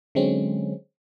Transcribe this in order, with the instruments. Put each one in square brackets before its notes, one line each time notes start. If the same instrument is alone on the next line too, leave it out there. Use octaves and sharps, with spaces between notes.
[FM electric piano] D3 F#3 G#3 C4 C#4